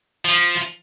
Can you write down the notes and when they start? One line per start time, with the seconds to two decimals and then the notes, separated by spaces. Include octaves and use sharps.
0.25 F3